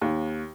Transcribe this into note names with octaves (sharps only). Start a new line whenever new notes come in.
D#2